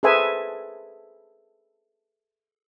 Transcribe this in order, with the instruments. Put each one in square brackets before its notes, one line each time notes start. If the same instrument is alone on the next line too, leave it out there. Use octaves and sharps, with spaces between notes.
[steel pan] G#4 A4 B4 C5 E5 G#5